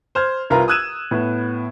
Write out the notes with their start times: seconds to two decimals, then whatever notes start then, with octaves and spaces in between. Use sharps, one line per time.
0.15 C5 F6 G#6
0.50 C2 F4 A#4 B4 A#5
0.68 D#6 E6 F#6 G#6 D#7 E7
1.11 A2 B3